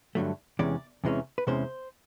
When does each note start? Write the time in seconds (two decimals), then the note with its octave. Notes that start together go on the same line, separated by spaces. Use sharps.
0.15 G2 D3 F#3 A3
0.59 E2 C3 E3 G#3 C#4 D5
1.04 E2 C3 E3 G#3 C#4
1.38 B4
1.47 E2 C3 E3 G#3 C#4 C5